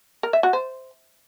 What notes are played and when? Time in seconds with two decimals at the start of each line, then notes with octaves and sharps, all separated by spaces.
0.23 A#4
0.33 E5
0.43 F#4
0.53 C5